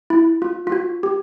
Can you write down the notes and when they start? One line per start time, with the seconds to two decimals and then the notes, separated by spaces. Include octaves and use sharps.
0.10 E4
0.42 F4
0.67 F4
0.72 F#4
1.03 G4